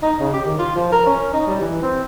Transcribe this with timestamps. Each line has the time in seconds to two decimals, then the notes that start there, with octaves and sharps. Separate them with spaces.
0.02 D#4
0.19 C#3
0.33 G4
0.45 D#3
0.59 F4
0.75 F3
0.92 A#4
1.06 C#4
1.33 D#4
1.47 G3
1.60 E3
1.82 C4